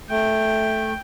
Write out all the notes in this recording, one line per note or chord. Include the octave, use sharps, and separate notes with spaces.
A3 G5